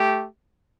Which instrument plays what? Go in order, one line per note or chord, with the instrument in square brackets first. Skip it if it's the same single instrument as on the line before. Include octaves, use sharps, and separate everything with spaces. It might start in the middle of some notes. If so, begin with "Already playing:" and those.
Already playing: [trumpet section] A3 G4